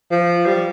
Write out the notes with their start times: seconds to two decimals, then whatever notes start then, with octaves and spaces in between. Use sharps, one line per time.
0.11 F3
0.46 G3